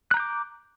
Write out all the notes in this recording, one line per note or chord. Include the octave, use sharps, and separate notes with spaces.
A#5 D6 F#6 G6